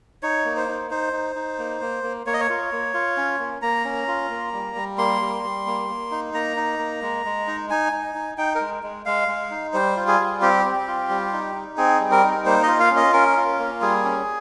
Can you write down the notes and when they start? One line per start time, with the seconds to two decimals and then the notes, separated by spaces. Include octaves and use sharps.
0.23 D#4 C#5
0.45 A#3
0.56 C5
0.68 D#4
0.90 D#4 C5
1.13 D#4
1.36 D#4
1.59 A#3
1.81 A#3
2.03 A#3
2.26 A#3 C#5
2.34 D#5
2.40 C#5
2.50 F4
2.72 A#3
2.94 F4
3.17 C#4
3.40 A#3
3.62 A#3 A#5
3.85 C#4
4.08 F4
4.31 A#3
4.53 G3
4.75 G3
4.98 A#3 C6
5.21 G3
5.44 G3
5.67 A#3
5.89 A#3
6.11 D#4
6.34 A#3 A#5
6.57 D#4
6.79 A#3
7.02 G#3
7.25 G#3
7.47 D#4
7.70 D#4 G#5
7.92 D#4
8.15 D#4
8.38 D#4 G5
8.55 A#4
8.61 G#3
8.83 G#3
9.06 G#3 F5
9.28 G#3
9.51 D#4
9.73 G3 C5
9.97 F4
10.08 G#4
10.20 G3
10.42 C4 G4
10.65 C4
10.87 F4
11.09 G3
11.33 D#4
11.55 D#4
11.77 C4 G#4
12.00 G3
12.11 A#4
12.24 D#4
12.46 A#3 C5
12.63 F4 D#5
12.80 F5
12.91 C#4
12.96 D#5
13.13 C#4 A#4
13.37 F4
13.59 A#3
13.81 G3 G#4
14.05 C#4